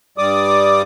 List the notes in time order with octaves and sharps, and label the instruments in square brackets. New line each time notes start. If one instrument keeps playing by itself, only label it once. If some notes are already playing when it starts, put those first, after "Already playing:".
[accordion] G2 G3 D5 D6 D#6